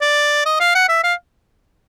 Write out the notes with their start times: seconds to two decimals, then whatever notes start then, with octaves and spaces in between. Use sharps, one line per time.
0.02 D5
0.45 D#5
0.60 F5
0.75 F#5
0.89 E5
1.04 F5